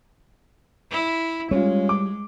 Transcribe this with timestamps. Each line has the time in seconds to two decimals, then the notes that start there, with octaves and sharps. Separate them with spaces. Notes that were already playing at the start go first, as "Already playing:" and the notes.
0.91 E4
1.51 G3 G#3 C#4 F4
1.89 D6